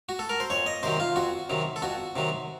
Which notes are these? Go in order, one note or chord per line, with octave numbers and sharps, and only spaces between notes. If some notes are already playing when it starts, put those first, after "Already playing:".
F#4
A4
A#4
C5
F2 C#5
D#5
C3 D#3 F#3 C5
F4
F2 F#4
C3 D#3 F#3
A4
F2 F#4
C3 D#3 F#3